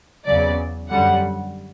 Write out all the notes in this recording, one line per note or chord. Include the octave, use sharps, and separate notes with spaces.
E2 C#3 F#3 D5
F#2 D3 G3 F#5